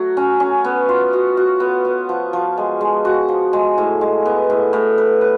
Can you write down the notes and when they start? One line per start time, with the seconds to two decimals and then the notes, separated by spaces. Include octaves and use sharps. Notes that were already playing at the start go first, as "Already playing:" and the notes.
Already playing: F#3 A3 F#4
0.17 C#4
0.40 C#4
0.64 B3
0.89 F4
1.13 F#4
1.37 F#4
1.60 B3
1.85 B3
2.09 F3
2.33 F3
2.58 G#3
2.81 G#3
3.05 F#4
3.28 F3
3.53 G#3
3.78 A2
4.01 G#3
4.25 B3
4.50 A2
4.73 A2
4.98 B4
5.21 B4